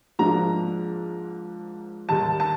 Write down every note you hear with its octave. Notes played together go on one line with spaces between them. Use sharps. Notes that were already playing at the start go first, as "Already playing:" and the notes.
G#2 F3 A#3 D4 A#5
D#2 D#3 G3 A5
A5